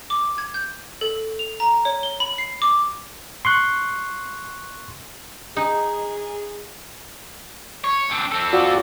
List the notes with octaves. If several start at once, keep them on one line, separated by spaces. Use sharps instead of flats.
D6
G#6
G6
A4
F7
A#5
C#5
G7
B5
C7
D6
C6 C#6 F#6
D#4 G#4
C#5
C4 D4
C4 A4
F4 F#4 D5